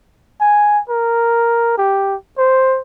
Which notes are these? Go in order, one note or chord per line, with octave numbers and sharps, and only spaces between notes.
G#5
A#4
G4
C5